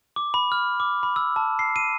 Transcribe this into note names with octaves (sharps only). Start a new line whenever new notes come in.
D6
B5
F6
D6
B5
E6
A5
C7
D#7